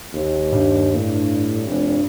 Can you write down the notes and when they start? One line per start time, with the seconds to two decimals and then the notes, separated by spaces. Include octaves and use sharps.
0.13 D#2
0.52 G2
0.95 A2
1.66 F1